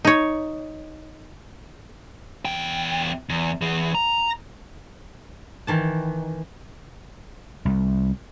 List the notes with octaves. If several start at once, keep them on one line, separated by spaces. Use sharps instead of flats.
D#4 C#5
E2 G5
E2
E3 G#4
A#5
D#3 E3 A5
C2